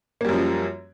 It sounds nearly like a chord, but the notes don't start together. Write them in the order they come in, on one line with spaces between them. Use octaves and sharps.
A#3 G3 F#2 F3